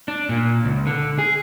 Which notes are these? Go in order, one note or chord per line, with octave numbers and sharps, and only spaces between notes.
D4
A#2
C#2
D3
G#4